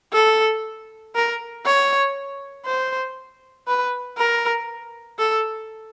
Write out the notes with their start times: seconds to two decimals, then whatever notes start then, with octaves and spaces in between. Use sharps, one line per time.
0.13 A4
1.15 A#4
1.66 C#5
2.66 C5
3.67 B4
4.18 A#4
5.19 A4